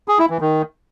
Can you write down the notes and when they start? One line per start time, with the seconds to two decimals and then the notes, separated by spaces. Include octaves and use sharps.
0.08 G#4
0.19 E4
0.30 E3
0.41 D#3